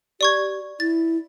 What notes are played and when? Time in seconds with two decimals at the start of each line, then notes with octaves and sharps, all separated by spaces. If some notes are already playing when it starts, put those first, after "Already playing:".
0.21 G4 D5 C#6 G#6
0.80 E4 A6